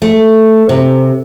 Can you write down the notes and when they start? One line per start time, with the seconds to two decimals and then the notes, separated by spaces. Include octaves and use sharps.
0.02 A3
0.69 C3